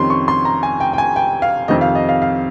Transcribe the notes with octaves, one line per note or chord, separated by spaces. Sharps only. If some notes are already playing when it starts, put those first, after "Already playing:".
Already playing: F2 C3 D#3 G3 C#4 C6
C#6
C6
A#5
G#5
G5
G5
G#5
G5
F5
F2 C3 D#3 D#5
F5
D#5
F5
F5